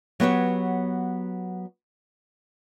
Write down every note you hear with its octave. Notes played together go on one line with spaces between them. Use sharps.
F#3 B3 G4 C#5